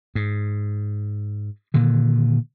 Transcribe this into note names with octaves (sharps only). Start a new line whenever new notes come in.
G#2
A#2 D3 D#3